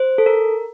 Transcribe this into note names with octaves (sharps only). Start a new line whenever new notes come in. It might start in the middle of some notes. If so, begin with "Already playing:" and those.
Already playing: C5
A4
A#4